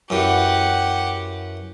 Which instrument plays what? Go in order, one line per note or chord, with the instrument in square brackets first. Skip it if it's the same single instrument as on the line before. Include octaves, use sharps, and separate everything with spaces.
[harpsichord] F#2 E3 [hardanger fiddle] G4 F#5